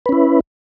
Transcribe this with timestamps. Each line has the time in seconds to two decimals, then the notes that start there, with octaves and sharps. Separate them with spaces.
0.06 B4
0.09 C#4
0.12 E4